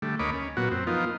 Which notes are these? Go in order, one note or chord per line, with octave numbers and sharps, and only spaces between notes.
D3 G3 A3
D2 A#3 C#5 D#5 B5 D6
C#4
A#2 F#3 B3 F#4
F#2 C4
F3 A#3 B3 D#4 F4